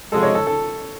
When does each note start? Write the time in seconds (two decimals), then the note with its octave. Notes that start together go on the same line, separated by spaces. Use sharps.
0.11 C3 F3 G#3 A4
0.23 C#5
0.35 A4
0.47 A4